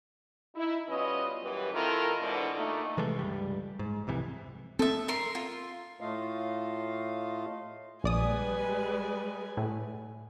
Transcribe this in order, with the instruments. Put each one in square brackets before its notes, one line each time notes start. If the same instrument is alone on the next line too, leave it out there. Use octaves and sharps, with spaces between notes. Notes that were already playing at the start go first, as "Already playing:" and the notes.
[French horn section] D#4 E4
B2 G3 C#4 F4 B4 D#5
F#2 E3 G3 B4
D#3 C4 E4 F4 A4 A#4
G#2 B2 D3 E3 G#3 D4
A#2 A3 D#4
[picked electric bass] C3 E3 G#3 A3
C#2 G2 G3
G#2
C2 F2 C3 E3
[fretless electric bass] C4 [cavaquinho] A4 E5
[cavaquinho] A#4 E5 C6
F4
[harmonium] A2 A3 F4 D#5 F5
[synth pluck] A#1 D5 D#6 [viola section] G3 G#3 B4 [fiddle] G#5
[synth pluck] A2